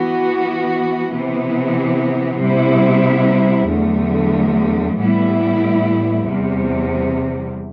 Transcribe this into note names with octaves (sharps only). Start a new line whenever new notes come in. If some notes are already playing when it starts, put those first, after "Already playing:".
Already playing: E3 B3 F#4
C3 E3 B3
C3 G3 B3 E4
E2 D3 F#3 A3
A2 E3 G3 B3 E4
E2 C3 G3